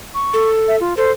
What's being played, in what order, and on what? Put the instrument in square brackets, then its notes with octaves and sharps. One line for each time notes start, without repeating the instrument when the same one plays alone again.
[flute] C#6
[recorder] A4
[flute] E5
F4
[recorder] A4 [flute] C5